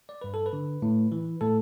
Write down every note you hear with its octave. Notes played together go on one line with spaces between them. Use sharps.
D5
G2 B4
A4
B4
D3
A2
E3
A2 A4